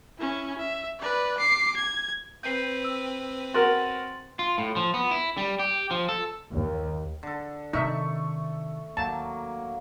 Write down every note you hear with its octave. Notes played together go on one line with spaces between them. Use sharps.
C#4 E4
E5
B4 D5
D6 C7
G#6
C4 B4 G6 C7
E6
F#4 A#4 C6 A6 F#7
F4
A2
F3
B3
E4
G3
G4
F3
A4
D#2
D3 A4
C3 D#3 A3 D#4 E5 C#6
D#2 F#3 A#3 A5